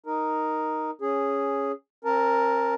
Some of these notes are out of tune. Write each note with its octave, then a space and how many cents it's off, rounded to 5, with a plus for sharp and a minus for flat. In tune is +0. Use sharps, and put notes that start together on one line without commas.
D#4 +0 A#4 +0
C#4 +0 G#4 -5
C4 +45 A#4 +0 A5 +0